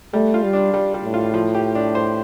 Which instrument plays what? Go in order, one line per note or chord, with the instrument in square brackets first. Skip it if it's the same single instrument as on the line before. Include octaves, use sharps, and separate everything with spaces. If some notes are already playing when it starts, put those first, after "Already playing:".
[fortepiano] G3 [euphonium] A3
[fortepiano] F4
[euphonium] G3
[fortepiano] D4
G3
G3
[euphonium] A2
[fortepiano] F4
F3
G4
D4
C5